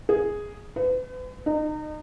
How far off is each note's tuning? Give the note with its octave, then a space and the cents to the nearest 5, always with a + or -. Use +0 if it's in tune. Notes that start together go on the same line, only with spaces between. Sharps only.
G#4 +0
B4 +40
D#4 -30